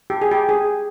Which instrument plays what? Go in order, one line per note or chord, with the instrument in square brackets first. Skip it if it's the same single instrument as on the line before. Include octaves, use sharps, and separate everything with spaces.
[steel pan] G4
G#4
G4
G#4